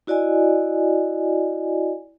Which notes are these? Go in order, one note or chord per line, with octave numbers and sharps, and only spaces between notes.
E4 F#4 D5 D#5 G#5